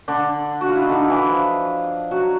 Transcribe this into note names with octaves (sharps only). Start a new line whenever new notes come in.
D3 D4
F#4
F4
E4
D#4
D3 D4
E3 E4
F3 F4
F#3 F#4